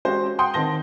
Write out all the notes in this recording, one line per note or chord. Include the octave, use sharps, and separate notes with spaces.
G#3 C#4 F#4 G4 C5
F#5 G5 C6 D#6 G6 D7
D#3 C4 A5 A#6 G7